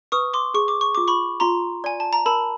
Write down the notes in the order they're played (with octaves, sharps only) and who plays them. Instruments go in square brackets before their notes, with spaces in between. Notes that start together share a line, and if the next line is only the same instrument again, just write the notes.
[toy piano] B4 [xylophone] C#6 D#6
[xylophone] C6 D6
[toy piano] G#4 [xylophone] C#6
[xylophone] D6
C#6
[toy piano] F4 [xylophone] D6
[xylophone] B5 C#6
[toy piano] F4 [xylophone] A#5 C6
[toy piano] D5 [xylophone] G#5
[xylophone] A5
A#5
[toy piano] A#4 [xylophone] A5 B5